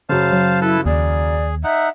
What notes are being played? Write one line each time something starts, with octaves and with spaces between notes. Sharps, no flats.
F#2 C#3 C5 F5 A5
F#3
E4 A4 B4 A5
D#2 G#4 D5
D#4 E5 F#5